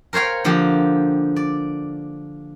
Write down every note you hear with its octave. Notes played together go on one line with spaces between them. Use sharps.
A#4 C5 C#5 F5 G5
D3 F3 A#3 G4
D5